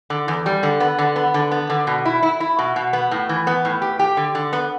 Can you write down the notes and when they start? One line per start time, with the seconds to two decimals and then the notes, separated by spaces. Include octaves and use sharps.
0.10 D3
0.28 E2
0.46 G3
0.63 D3
0.80 B3
0.98 D3
1.16 B3
1.34 D3
1.52 B3
1.70 D3
1.87 B2
2.05 E4
2.23 E4
2.40 E4
2.59 B2
2.76 B2
2.93 B3
3.11 A2
3.29 E3
3.47 B3
3.65 A2
3.82 G4
3.99 G4
4.17 D3
4.35 D3
4.53 B3